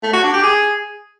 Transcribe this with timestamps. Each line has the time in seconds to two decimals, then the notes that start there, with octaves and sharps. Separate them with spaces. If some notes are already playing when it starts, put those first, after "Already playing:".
0.03 A3
0.13 F#4
0.23 D4
0.33 G4
0.44 G#4